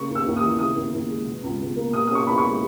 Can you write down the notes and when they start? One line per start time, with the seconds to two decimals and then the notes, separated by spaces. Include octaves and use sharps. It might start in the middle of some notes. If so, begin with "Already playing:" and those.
Already playing: C#3 A#3 C#6
0.09 D#2
0.15 E6
0.26 D#2
0.37 D#6
0.42 E3
0.59 C#3 D#6
0.76 D#2
0.93 D#2
1.09 G#3
1.26 B2
1.43 C#2
1.60 C#2
1.76 A#3
1.93 B2 D#6
2.07 C#4 D#6
2.15 C#6
2.27 E2 B5
2.38 C#6
2.44 G#3